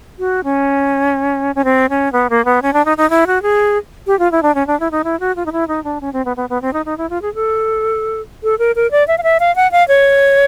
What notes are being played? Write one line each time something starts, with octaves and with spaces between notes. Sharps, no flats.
F#4
C#4
C#4
C4
C#4
B3
A#3
B3
C#4
D4
D#4
D#4
E4
F#4
G#4
G4
F4
E4
D4
C#4
D4
E4
D#4
E4
F#4
F4
D#4
E4
D#4
D4
C#4
C4
B3
B3
B3
C4
D#4
D#4
E4
F4
G#4
A4
A4
A#4
A#4
D5
E5
F5
E5
F5
F#5
F5
C#5